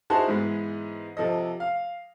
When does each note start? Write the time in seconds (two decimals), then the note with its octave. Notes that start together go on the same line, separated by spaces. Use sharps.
0.10 D#4 E4 F#4 G#4 C5 A5
0.28 G#2 E3 G#3 B3
1.17 C3 F3 A4 D#5
1.60 F5